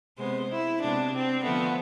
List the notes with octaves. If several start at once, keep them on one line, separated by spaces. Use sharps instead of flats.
C3 G#3 B3 C5
E4
C3 G#3 B3 D4
C4
D3 F3 A3 B3